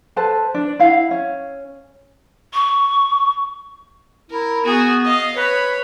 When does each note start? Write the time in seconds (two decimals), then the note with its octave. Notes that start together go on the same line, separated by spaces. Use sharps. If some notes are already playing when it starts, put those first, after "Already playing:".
0.16 A4 B4 C5 A5
0.54 D4
0.79 E4 F5 F#5
1.11 C#4
2.54 C#6
4.31 E4 A#4
4.64 B3 F#4 G#4
5.05 D#5 F5
5.36 B4 C#5 B5